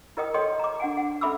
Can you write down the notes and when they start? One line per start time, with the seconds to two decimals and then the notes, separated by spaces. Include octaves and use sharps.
0.17 E4 A#4 D#5 G5 D#6
0.34 A4 C#5 D#5 G5 C6 D#6
0.59 A#5 D6
0.80 D4 F#5 G#5
0.97 F#5
1.21 C#4 A4 E5 B5 D6 E6